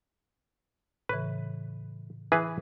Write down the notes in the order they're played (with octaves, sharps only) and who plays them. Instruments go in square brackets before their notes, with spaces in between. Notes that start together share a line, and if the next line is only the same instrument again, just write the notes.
[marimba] A2 C#3 E3 [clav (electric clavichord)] B4
[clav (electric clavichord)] E3 G#4 B4